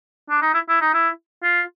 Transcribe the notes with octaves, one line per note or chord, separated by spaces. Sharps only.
D4
D#4
E4
E4
D#4
E4
F4